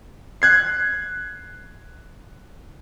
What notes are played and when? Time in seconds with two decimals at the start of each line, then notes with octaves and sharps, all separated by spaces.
0.42 F#6 G#6 C7